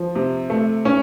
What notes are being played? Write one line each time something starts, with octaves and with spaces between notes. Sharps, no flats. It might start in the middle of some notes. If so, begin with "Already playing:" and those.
Already playing: F3
C3
A3
C#4